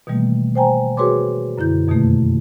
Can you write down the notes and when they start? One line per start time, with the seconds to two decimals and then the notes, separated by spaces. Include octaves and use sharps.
0.07 B2 D#3 E3 G3 A3 A#3
0.55 C5 G5 G#5 A#5
0.97 F#4 G#4 B4 C#5 C6 D6
1.58 F#2 D3 E4 G6
1.88 F2 B2 D#3 A3 A#3